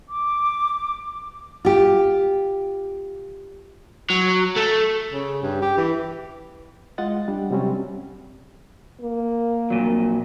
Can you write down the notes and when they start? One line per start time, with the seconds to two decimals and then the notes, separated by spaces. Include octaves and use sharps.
0.09 D6
1.65 F4 G4
4.10 F#3
4.56 A3
5.13 C#3
5.42 G2
5.62 G4
5.78 E3
6.98 G#3 F4 D#5 F#5 A6
7.28 G3 D4
7.51 C3 F#3 G3 C4 C#4
9.01 A#3
9.70 F2 A#2 F#3